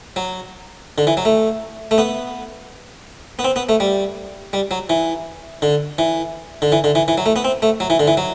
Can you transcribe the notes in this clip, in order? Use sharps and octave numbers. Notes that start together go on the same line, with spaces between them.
F#3
D3
E3
F#3
A3
A3
B3
B3
C4
B3
A3
G3
G3
F#3
E3
D3
E3
D3
E3
D3
E3
E3
F#3
A3
B3
C4
A3
F#3
E3
D3
E3
F#3